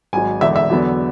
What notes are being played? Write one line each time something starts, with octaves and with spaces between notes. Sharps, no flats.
G#1 G#2 F#3 G#5
E1 E2 D3 E5
E5
E2 D3 F#3 B3